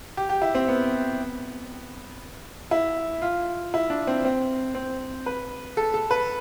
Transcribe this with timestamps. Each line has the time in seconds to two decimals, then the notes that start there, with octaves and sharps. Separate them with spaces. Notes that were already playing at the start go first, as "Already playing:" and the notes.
0.17 G4
0.29 G4
0.42 E4
0.55 C4
0.68 B3
2.71 E4
3.22 F4
3.74 E4
3.90 D4
4.07 C4
4.25 C4
4.75 C4
5.26 B4
5.77 A4
5.94 A4
6.11 B4